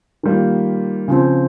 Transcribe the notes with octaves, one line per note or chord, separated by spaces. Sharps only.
D#3 G3 A#3 F4
C#3 F3 C4